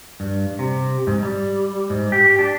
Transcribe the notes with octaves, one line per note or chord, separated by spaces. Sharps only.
G2
C3
G#2
G3
G#2
G4
D4